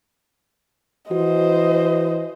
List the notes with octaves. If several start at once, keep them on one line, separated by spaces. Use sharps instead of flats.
E3 F#4 C5 D#5